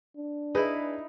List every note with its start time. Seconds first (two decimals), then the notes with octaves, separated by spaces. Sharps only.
0.17 D4
0.55 D#4 E4 G#4 B4